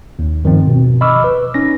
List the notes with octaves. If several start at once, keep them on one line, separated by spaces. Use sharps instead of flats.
D#2
G2 D#3 F3 C4
B2
D#5 B5 C#6 D6 E6 F6
B4
C#4 D#4 A#6